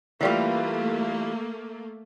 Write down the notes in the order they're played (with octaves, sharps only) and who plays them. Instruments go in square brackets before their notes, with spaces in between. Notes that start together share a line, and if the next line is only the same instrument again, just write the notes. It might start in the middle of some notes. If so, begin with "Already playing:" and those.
[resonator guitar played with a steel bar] E3 G3 F4 [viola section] A3 A#3